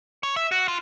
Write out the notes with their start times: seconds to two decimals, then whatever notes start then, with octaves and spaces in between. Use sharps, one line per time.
0.23 C#5
0.36 E5
0.51 F#4
0.68 F4